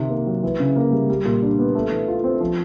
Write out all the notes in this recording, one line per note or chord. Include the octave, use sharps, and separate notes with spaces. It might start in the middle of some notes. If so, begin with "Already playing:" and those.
Already playing: C3 D#3
A#3
F#3
E3
C#3
A#3
G3
G3
A#2
D4
B3
A3
E3
F4
C4
F3